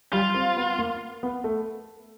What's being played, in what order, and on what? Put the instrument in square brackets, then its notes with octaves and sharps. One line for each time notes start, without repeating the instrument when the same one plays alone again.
[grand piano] G3 [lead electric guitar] F4
[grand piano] C4
B3
A#3
B3
A3